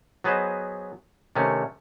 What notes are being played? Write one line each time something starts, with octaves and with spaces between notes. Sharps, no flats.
F#3 B3 G#4 B4 C5 D#5
C3 D#3 A3 C#4